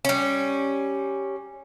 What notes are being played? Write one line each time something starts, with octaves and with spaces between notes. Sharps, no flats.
G3 C#4